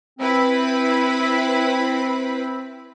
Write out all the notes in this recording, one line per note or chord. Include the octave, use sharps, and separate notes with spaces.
C4 E4 B4 B5